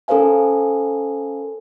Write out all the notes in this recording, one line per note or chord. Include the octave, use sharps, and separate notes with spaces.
C#4 A4 A#4 C5 F5 G#5